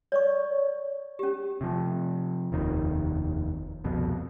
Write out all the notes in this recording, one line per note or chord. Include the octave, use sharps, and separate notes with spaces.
C#5 D5 C#6
C#4 G4
C3 F3
F1 D#2 D#3
C2 F2 B2